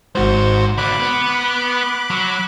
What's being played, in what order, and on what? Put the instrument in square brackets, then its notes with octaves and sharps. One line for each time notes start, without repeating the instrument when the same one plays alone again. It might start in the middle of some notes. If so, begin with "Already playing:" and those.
[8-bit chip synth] G#1 F#4 C5 [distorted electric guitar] G#2
[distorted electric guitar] B1 D3 [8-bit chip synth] B5 D6 F#6
[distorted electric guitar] B3 B4
F#3